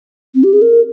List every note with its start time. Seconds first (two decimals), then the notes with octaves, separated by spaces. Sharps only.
0.35 C4
0.44 G4
0.53 G#4
0.62 A#4